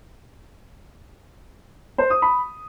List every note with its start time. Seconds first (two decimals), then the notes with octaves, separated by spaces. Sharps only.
1.98 C5
2.10 D#6
2.22 B5